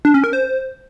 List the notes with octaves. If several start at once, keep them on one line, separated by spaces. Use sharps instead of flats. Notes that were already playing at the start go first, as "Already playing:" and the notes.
D4
C#4
A#4
C5